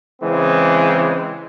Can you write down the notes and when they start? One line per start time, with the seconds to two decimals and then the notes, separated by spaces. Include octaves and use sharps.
0.21 C#3 E3 G#3 C4